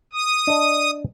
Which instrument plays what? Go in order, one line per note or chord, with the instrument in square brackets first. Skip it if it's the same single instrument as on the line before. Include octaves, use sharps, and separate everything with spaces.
[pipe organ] D#6
[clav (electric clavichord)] D4 D#5